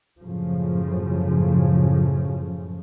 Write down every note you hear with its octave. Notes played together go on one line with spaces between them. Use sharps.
F#2 A2 C#3 F3